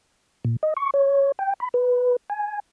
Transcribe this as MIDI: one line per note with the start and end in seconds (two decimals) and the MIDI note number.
0.45 0.56 46
0.63 0.74 75
0.77 0.90 85
0.94 1.32 73
1.39 1.54 79
1.60 1.69 83
1.74 2.16 71
2.30 2.59 80